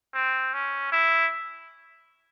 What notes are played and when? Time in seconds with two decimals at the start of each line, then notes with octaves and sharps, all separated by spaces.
0.14 C4
0.54 C#4
0.92 E4